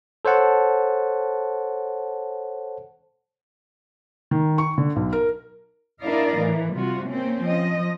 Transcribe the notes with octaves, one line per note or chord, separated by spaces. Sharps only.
A4 C5 C#5 F#5 A5
D#3
C#6
D3
B1
A#4
D4 E4 A#4 D5 D#5 F5
A2 E3
C3 G3 F4 F#4
A#3 C4 C#4
F3 D#5